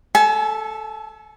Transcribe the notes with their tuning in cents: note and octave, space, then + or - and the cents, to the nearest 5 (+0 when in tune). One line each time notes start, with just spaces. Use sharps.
A4 +0 G#5 +35